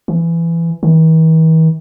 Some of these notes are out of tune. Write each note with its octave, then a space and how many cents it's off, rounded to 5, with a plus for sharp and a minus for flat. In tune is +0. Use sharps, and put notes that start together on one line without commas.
E3 +20
E3 -45